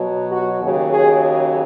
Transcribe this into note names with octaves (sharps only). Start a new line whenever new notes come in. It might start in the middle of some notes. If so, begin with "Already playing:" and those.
Already playing: B2 F#3
F#4
D#2 C#3 F#3
G#4